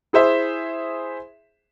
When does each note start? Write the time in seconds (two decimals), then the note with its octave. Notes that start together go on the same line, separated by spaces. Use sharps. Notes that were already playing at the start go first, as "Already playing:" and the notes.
0.13 E4 G#4 C5 E5